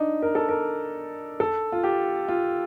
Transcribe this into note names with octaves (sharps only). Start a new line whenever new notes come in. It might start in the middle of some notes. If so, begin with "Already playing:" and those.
Already playing: D4 D#4
A#4
A4
A#4
A4
F4
G4
F4